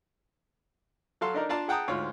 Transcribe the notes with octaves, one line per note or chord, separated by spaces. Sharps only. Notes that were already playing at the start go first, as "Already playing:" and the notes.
F#3 F#4 A4 F5 C6
D4 D#4 A#4 D5
D4 F4 D5 F5 A5 A#5
G#4 F#5 G5 A5 A#5 D#6
D2 G#2 F4 C#5